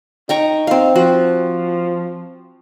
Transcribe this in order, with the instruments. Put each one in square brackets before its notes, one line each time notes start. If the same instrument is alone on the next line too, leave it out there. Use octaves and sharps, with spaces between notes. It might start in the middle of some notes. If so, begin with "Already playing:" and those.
[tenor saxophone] D#4 [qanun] G5 A#5 C#6
[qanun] C4 F5
[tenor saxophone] F3 [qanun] F#4